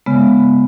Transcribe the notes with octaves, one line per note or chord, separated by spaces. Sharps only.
C#3 G#3 B3